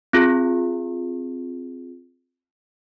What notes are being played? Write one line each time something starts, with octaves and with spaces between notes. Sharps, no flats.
C4 F4 G#4